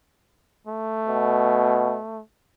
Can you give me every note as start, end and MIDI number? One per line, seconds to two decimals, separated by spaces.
0.67 2.22 57
1.07 1.97 47